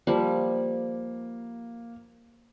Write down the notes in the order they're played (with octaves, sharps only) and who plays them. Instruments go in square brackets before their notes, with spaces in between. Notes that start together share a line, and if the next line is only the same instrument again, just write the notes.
[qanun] F3 G3 [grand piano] A#3